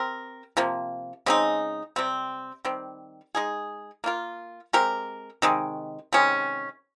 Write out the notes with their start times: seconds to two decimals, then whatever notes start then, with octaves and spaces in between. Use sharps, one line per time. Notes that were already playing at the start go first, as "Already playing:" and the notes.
Already playing: C4 G4 A#4
0.57 C3 F3 A#3
1.26 C#3 G#3 C4 D#4
1.96 C3 G3 C4
2.65 D#3 G3 C4
3.35 G#3 D#4 G#4
4.04 A#3 F4 A#4
4.73 G#3 C4 G4 A#4
5.42 C3 D#3 G#3
6.13 C3 D#3 G#3 C#4